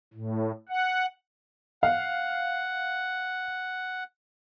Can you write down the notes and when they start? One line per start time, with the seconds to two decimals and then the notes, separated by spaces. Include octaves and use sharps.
0.14 A2
0.69 F#5
1.83 F5 F#5